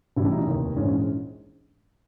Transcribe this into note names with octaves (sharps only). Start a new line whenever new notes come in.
B1 A2 E3 G3 E4
D#4
F1 D#2 D#3
A#1 G#2 E3 G#3 C#4